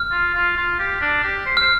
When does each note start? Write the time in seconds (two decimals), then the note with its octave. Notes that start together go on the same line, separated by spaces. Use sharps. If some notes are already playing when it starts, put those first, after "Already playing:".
Already playing: F6
0.11 F4
0.35 F4
0.57 F4
0.79 G4
1.01 D4
1.24 G4
1.46 C5
1.57 C5 F6